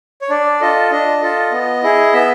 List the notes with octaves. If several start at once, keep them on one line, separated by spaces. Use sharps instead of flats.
C#5
D4 D5
F4 A4 D#5
D4 D#5
F4 A4
B3
E4 G#4
B3 E5